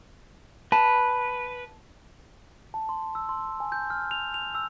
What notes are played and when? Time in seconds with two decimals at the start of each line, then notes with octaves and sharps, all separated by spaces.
0.72 B4 A5
2.74 A5
2.89 C6
3.15 E6
3.29 C6
3.60 G#5
3.72 G6
3.90 F6
4.11 F7
4.34 F7
4.55 E6